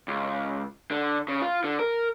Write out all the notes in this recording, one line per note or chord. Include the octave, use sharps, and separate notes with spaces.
C#2
D3
C#3
F4
D3
A#4